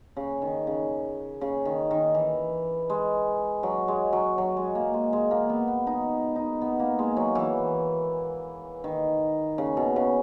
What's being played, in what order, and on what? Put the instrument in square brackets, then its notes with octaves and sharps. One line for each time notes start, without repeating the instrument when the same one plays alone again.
[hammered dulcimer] C#3
D#3
C#3
C#3
D#3
D#3
E3
G#3
F#3
G#3
F#3
F#3
G#3
A#3
G#3
G#3
A#3
B3
B3
D#4
D#4
B3
A#3
G#3
F#3
E3
D#3
C#3
B2
C#3